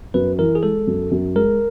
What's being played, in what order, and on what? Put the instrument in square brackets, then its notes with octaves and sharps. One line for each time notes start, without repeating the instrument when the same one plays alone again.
[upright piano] F#2 [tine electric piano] B4
[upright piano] E3 [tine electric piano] A#4
[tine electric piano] G#4
[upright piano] G#3 [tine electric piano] A4
[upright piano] F#2
F#2
[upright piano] G#3 [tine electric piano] A#4